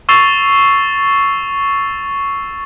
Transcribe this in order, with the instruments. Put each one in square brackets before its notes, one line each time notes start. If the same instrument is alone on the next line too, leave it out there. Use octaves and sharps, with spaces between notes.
[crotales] C#6 E6 A6 C7 D#7 F7